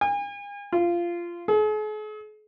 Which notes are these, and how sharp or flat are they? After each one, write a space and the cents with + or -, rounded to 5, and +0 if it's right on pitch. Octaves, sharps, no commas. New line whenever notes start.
G#5 -40
F4 -15
G#4 +45